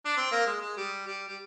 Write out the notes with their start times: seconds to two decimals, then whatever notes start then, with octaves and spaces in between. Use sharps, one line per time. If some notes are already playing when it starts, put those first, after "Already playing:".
0.06 D4
0.17 C4
0.32 A#3
0.47 G#3
0.62 G#3
0.77 G3
1.07 G3
1.28 G3